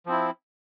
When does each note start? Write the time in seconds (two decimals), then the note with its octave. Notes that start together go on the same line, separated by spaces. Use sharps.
0.06 F3
0.09 C4
0.12 E4